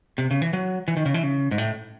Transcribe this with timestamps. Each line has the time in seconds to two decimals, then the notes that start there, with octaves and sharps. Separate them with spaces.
0.18 C3
0.31 C#3
0.42 E3
0.53 F#3
0.88 E3
0.97 D#3
1.06 C#3
1.14 E3
1.23 C#3
1.51 G#2
1.58 A2